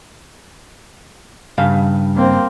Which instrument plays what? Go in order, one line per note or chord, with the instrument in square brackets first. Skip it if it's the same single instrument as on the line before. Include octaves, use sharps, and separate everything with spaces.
[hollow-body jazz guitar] G2 C#3 F5
[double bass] A#3 C4